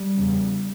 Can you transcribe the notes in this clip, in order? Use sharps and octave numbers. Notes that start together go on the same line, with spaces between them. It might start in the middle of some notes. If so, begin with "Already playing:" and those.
Already playing: G3
E2 C#3